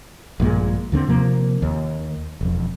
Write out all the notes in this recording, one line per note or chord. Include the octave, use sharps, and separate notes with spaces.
A#1 G2 A#2 G#3
D#2 D3 A#3 C4
C3 F3 A#3
D#2
E1 F2